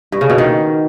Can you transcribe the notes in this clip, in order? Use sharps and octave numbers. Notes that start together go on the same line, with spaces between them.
G2
C#3
B2
D#3